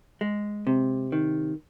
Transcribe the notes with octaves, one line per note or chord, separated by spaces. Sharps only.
G#3
C3
D#3